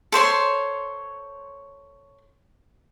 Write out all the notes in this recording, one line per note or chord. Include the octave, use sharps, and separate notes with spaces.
A4 C5 C#5 C6